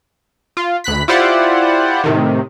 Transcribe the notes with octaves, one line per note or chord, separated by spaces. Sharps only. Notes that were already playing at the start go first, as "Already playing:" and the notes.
F4
D2 B5 F#6 B6
E4 F4 G4 C5 D5 F#5
A2 C3 D#3